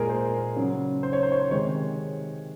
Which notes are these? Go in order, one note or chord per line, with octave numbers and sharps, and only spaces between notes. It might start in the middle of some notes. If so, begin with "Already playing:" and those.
Already playing: A#2 G#3 G#4 A#4
C5
C#3 F#3
C5
C#5
C5
C#5
C5
C3 D#3 G#3 C#5